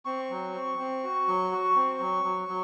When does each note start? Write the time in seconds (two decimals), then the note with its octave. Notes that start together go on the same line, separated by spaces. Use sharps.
0.05 C4 C#6
0.30 F#3
0.54 C4
0.79 C4
1.03 F#4
1.27 F#3
1.52 F#4
1.76 C4
2.00 F#3
2.24 F#3
2.48 F#3